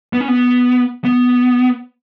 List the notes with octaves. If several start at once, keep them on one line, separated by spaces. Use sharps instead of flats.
B3
C#4
B3
B3